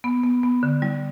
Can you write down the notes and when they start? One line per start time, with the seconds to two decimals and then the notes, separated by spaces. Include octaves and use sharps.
0.04 B3
0.23 B3
0.43 B3
0.63 D3
0.82 G3